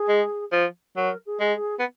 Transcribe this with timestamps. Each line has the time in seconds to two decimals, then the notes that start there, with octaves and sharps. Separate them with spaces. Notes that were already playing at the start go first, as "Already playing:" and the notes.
Already playing: G#4
0.09 G#3
0.52 F3
0.96 F#3 A#4
1.26 G#4
1.40 G#3
1.54 G#4
1.79 B3